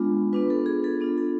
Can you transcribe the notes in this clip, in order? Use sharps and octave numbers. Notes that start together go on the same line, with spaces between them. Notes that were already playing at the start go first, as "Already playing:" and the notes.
Already playing: G#3 B3 D4 F4
B3 D4 F4 B4
A4
G#4
A4
B3 D4 F4
A4